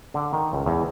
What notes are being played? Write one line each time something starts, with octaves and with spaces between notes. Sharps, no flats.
D3
D#3
C#2
E2